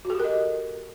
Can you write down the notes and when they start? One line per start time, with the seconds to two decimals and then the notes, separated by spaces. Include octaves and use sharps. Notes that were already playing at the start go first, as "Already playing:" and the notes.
0.05 F#4
0.10 A4
0.15 G4
0.20 A#4
0.25 D#5